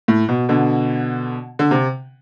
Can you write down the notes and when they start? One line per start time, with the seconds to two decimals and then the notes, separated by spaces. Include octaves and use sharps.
0.08 A2
0.29 B2
0.49 B2 D3
1.59 D3
1.71 C3